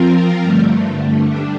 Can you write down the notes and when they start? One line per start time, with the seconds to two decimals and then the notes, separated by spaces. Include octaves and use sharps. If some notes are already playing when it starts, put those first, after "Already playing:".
Already playing: F3 C4 F4 A#4
0.42 G2 D3 A3
1.27 G3 D4